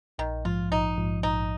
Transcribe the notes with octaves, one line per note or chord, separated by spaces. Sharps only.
A#1 D#3
G#2 F3 F4
A#1 D#4
G#2 F3
A#1 D#4